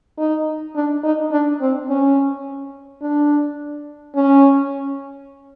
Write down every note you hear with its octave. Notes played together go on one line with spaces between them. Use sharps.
D#4
D4
D#4
D4
C4
C#4
D4
C#4